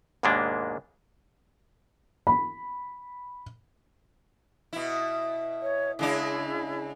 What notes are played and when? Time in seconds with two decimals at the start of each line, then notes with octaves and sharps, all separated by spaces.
0.23 D#2 G#2 B2 G#3 A#3 D4
2.27 B5
4.73 B2 E4
5.62 C#5
5.99 C#3 G#3 D4 E4